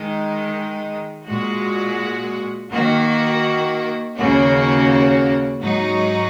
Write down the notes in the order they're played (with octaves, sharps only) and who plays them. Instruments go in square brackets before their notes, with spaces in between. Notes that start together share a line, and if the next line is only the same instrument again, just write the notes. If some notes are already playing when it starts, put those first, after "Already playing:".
Already playing: [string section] D#3 G#3 D#4
A#2 G#3 F#4
D#3 A#3 F#4
D#2 C#3 A#3 C#4 F#4
G#2 F#3 D#4 F#4